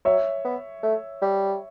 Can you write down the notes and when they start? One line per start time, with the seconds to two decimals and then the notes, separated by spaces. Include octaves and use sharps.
0.05 F#3 C#5 E5
0.44 B3
0.83 A3
1.21 G3